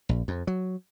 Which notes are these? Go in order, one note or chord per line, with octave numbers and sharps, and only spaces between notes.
A#1
F2
F#3